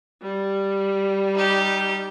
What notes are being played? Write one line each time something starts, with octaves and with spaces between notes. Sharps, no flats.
G3
D#4 G4